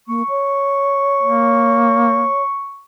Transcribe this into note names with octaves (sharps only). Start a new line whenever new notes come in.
A#3 C#6
C#5
A#3